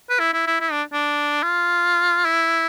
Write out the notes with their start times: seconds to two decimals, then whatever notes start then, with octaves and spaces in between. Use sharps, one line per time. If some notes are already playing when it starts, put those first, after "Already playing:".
0.10 B4
0.19 E4
0.34 E4
0.47 E4
0.60 E4
0.72 D4
0.93 D4
1.43 F4
2.25 E4